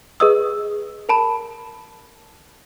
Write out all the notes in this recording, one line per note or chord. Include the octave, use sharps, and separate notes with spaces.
G#4 B4 D#5 D#6 E6
A#4 A5 B5